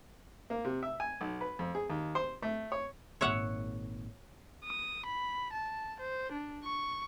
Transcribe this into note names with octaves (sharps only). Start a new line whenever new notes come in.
A#3
C3
E5
G#5
B1
B4
F2
G#4
D#2
C5
A3
C#5
G#1 A#2 C#5 E5 F#5
D#6
B5
A5
C5
D4
C#6